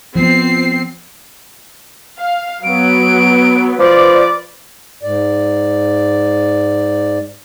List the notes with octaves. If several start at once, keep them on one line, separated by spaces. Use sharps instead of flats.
F3 B3 C4 C7
F5
F#3 B3 D7
F3 B4 D5 D6
G#2 D5